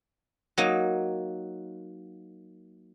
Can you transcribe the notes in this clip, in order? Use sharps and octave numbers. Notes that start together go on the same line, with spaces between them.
F#3 A#3 D#4